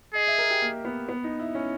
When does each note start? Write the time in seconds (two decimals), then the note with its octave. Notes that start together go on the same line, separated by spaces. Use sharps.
0.15 G#4 D#5
0.27 E5
0.38 A#4
0.50 G4
0.62 A#3
0.85 B3
1.09 B3
1.24 D#4
1.39 E4
1.55 C#4